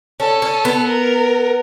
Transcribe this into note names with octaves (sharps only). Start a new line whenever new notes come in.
C#4 A4
C#4
B3
A#4